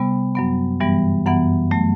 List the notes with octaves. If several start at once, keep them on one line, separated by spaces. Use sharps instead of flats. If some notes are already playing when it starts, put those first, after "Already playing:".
Already playing: C3 G3 B3
F#2 F#3 B3
G2 E3 G3 B3
F#2 E3 B3 F#5
F#3 A3